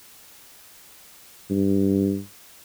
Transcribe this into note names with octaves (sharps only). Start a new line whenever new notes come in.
G2